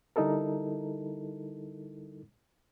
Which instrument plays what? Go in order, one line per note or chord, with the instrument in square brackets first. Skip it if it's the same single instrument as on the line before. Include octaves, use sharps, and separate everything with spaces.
[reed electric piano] D3 G3 D#4 E4 A4 A#4